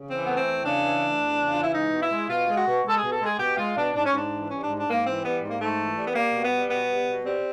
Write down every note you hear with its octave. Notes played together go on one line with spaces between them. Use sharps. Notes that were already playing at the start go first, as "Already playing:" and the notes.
Already playing: C#3
E3 C4
A3 B3
C4
E2
C#3 D4
E3
A3
E2
C#3
E3 F4
E4
G#3 D#4
B2
E4
G#3
B2 F4
G#3
F#4
B2
G#3 A4
G#4
B2
A4
G#3 G#4
B2 G4
G#3 F4
B2 D4
G#2 D4
C#4
G#2 D4
E3
G3 C#4
G#2 D4
D4
G#2 A#3
E3 C4
G3 B3
G#2
A#3
G#2 A3
E3
G3
B3
G3 A#3
B2
B3
G3
B2 B3
G3
B2
G3 C4